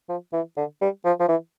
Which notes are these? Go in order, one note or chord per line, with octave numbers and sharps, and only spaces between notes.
F3
E3
D3
G3
F3
F3
E3